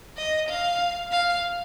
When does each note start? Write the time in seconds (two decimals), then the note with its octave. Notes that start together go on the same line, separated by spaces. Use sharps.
0.17 D#5
0.49 F5
1.12 F5